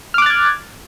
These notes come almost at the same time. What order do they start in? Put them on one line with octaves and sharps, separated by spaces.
F6 D6 F#6 A6 G#6